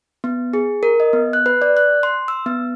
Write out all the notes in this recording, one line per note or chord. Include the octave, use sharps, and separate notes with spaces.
B3
G#4
A#4
D#5
B3
F#6
B4
D5
F#6
C6
E6
B3